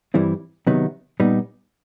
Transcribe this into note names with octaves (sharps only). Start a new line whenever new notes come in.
G2 E3 G3 C4 E4
C3 D#3 F#3 B3 D#4
A#2 G3 B3 D#4